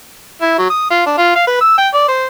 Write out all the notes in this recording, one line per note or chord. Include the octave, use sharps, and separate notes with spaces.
E4
F#3
D#6
F4
D4
F4
F5
B4
E6
G5
D5
C5